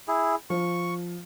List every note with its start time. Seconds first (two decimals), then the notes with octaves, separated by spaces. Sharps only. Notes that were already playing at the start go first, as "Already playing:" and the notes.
0.08 E4 G#4
0.50 F3 C#6